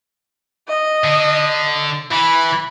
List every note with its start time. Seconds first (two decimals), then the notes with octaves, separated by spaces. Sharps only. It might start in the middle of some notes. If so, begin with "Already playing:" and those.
0.68 D#5
1.04 D3
2.11 E3 B5